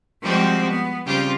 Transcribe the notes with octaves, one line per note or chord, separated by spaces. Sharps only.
F3 G3 G#3 C4 F#4 G4
B3
C#3 G3 C4 F4 G4